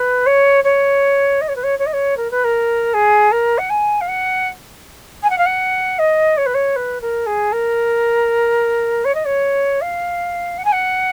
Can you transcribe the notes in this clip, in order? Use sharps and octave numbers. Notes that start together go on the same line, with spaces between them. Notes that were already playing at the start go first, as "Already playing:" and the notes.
Already playing: B4
C#5
C#5
D#5
C#5
B4
C#5
C#5
D#5
C#5
A#4
B4
A#4
G#4
A#4
F#5
G#5
F5
F#5
G#5
F#5
F5
F#5
D#5
C#5
B4
C#5
B4
A#4
G#4
A#4
C#5
D#5
C#5
F5
F#5
G#5
F#5